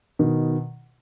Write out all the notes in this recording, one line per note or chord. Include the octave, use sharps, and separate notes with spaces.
B2 D#3